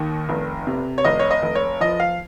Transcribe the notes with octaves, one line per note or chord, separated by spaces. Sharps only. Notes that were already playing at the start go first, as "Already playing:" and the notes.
Already playing: D#2 D#3
F1
C3
C#5
F1 D#5
C#5
D#5
F1
C#5
F3 D#5
F5